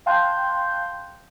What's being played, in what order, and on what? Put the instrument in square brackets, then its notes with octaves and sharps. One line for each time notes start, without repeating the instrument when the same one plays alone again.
[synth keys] F5 G5 A5 C6 F#6 G6